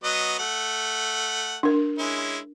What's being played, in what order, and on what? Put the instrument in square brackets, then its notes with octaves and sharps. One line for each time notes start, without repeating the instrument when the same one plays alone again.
[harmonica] F#3 B3 D#5
A3 F#5
[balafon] D4 A#4
[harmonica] G#3 C#4 E4